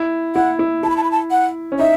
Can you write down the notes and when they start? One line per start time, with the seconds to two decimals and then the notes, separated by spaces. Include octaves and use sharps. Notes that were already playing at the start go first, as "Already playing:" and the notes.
Already playing: E4
0.35 E4 F#5
0.59 E4
0.83 E4 A5
0.90 B5
0.97 A5
1.04 B5
1.12 A5
1.31 F#5
1.72 C#4
1.79 D#4 E5